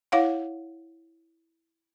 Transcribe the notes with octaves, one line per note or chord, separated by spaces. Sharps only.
E4 C#5 F5 F#5